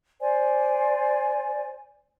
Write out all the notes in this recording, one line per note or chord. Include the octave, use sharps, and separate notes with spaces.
C5 D5 G#5